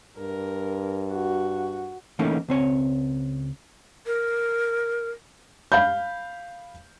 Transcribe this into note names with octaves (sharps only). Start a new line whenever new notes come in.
G2 A#4
F#4
E3 A3 A#3 C#4 D#4
C#2 C4 C#5
A#4
F5 B5 G6